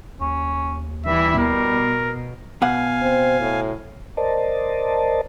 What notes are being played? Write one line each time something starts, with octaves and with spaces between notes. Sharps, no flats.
D#2 C#4
E3 G3 E4 E5
B2 A#4
B2 F5 F#5 G#5
C4
A2
A#4 C5 D5 D#5 A5